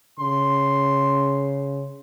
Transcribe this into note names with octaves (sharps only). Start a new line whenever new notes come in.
C#3 C6